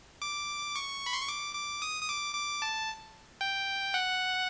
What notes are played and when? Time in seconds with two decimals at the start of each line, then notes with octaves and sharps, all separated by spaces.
0.22 D6
0.76 C#6
1.06 B5
1.13 C6
1.22 C#6
1.28 D6
1.55 D6
1.82 D#6
2.02 D#6
2.09 D6
2.35 D6
2.62 A5
3.41 G5
3.94 F#5